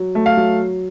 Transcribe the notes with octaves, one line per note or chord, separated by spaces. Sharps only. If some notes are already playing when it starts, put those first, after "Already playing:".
Already playing: F#3
A3
F5
F#3